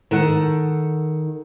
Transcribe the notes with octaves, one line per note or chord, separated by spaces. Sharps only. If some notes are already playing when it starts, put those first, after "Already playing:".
D#3 A4 F#5